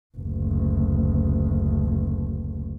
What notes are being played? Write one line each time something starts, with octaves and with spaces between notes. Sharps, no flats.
F#1 D2